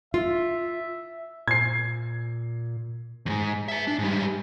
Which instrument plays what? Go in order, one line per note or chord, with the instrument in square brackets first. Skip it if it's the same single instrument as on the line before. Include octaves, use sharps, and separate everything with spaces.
[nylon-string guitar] F4 [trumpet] E5
[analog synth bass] A#2 [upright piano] G#6 C7
[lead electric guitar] F2 G#2
G#4 E5
D4
G#2 G3